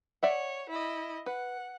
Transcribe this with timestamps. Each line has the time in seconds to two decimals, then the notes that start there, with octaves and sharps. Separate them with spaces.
0.23 C#5 D5 E5 F#5
0.69 E4 D#5
1.26 B4 F#5